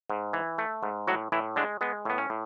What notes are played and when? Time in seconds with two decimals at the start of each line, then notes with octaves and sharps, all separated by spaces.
0.10 G#2
0.33 E3
0.58 A3
0.83 G#2
1.07 A2 F#3 F#4
1.32 A2 E3 E4
1.56 D3 G#3 D4
1.81 G#3 B3
2.05 A2 B3
2.18 C#4
2.30 A2